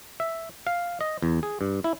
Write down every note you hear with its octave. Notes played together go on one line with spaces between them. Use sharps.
E5
F5
D#5
E2
G#4
G2
E4